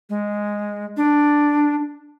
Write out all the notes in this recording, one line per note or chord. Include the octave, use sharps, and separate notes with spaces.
G#3
D4